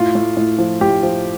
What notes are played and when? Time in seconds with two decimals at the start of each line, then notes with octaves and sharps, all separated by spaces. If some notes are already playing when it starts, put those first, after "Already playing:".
Already playing: A2 F4
0.15 A2
0.37 A2
0.58 F3
0.81 A2 G4
1.03 F3